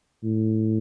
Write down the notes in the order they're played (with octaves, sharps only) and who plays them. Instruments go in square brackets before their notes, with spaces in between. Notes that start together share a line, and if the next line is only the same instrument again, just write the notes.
[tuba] A2